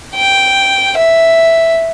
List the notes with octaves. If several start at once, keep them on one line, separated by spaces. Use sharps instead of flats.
G5
E5